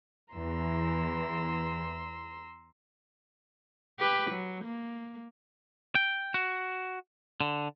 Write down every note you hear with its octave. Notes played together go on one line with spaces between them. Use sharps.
E2 E3 A#5 C6 E6
G4 B4
F#3
A#3
G5
F#4
D3